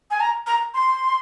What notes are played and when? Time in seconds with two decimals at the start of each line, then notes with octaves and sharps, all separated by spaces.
0.11 G#5
0.20 A#5
0.47 A#5
0.74 C6